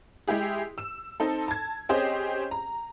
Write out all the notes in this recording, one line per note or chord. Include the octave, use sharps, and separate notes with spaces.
G#3 E4 G4 G#4
E6 E7
C4 D#4 A4
A5 G#6
C4 C#4 G4 G#4 C5 D#5
A#5